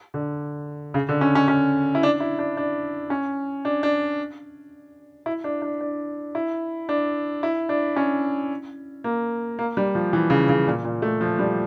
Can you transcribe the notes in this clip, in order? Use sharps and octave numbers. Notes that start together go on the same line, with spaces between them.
D3
C#3
D3
C#4
C#4
C#4
E4
D4
E4
D4
D4
C#4
D4
D4
E4
D4
D4
D4
E4
D4
E4
D4
C#4
A#3
A#3
G3
F3
E3
C#3
C#3
A#2
A#2
A3
F3
G3